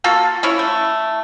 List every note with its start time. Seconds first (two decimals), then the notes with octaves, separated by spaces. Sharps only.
0.04 A#3 F4 F#4 A4
0.43 C#4 E4 C#5
0.59 A3